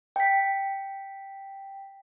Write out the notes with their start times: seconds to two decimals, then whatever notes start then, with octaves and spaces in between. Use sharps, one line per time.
0.16 G5 B6